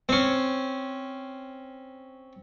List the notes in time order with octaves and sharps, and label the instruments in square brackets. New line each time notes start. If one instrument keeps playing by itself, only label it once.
[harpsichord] C4 C#4